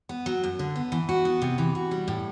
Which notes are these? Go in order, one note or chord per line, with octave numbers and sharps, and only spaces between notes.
B3
F#3
F#2
D3
B3
E3
F#4
B3
C3
E3
F#4
G3
A2